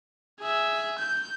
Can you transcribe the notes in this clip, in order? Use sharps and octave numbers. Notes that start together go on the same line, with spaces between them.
G#4 E5
G6